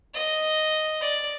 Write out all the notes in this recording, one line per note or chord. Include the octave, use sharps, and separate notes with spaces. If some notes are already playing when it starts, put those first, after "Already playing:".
D#5
D5